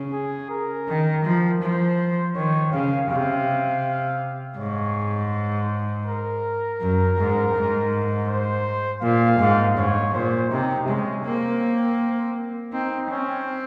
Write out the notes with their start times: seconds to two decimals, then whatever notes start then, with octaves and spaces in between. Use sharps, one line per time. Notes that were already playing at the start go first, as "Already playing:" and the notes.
Already playing: C#3
0.13 G#4
0.50 A#4
0.88 D#3
1.24 F3
1.62 F3 C5
2.35 D#3 C#5
2.73 C#3 F5
3.10 C3 F5
4.57 G#2 C#5
6.06 A#4
6.81 F#2
7.18 G#2
7.55 G#2
8.29 C5
9.02 A#2 F5
9.39 G#2
9.77 G#2 C#5
10.14 A#2 C5
10.50 C3 D#4
10.88 G#3 C#4
11.25 A#3 C4
12.73 C4 D#4
13.10 C4 C#4